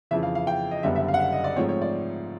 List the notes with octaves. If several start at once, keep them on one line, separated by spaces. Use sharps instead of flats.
F2 C#3 E3 E5
F5
F5
G5
D#5
F#1 F#2 D3 G3 B3 E5
E5
F5
F#5
F5
D#5
D5
G#2 F3 A3 C4 C#5
C#5
D5